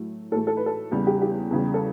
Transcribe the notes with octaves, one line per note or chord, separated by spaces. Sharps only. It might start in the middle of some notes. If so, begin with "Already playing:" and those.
Already playing: A2 F#3 A3
A2 E3 A3 A4
A4
B4
A4
E2 C#3 G3
G4
G4
E2 C#3 G3
A4